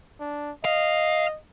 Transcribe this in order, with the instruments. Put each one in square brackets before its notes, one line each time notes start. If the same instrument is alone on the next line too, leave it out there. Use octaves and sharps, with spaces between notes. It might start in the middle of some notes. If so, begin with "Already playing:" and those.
[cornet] D4
[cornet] D#5 [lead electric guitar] F5